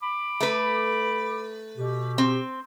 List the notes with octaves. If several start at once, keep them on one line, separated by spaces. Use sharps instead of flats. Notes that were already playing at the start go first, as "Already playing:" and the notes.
B5 D6
A3 B4
B2 G4
C4